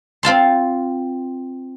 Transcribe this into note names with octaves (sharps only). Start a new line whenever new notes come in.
C4 F4 A5 C6